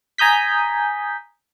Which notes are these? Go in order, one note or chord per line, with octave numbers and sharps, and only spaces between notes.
G#5 A#5 D#6 G6 B6